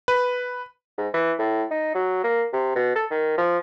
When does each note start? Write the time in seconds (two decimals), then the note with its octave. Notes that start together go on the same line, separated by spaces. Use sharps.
0.08 B4
0.98 G#2
1.14 E3
1.39 A2
1.71 D#4
1.95 F#3
2.24 A#3
2.53 C3
2.75 B2
2.95 A4
3.11 D#3
3.38 F3